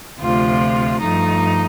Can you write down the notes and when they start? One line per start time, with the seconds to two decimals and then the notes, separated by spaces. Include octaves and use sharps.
0.20 D2 C3 F3 F4
1.01 G2 F3 A3 D#4